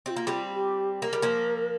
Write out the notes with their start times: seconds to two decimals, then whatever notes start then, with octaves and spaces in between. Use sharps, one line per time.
0.06 C4 G4
0.10 F4
0.17 A#3
0.27 G3 C4
0.55 G4
1.02 A#3 A#4
1.13 G3
1.22 F3 A#3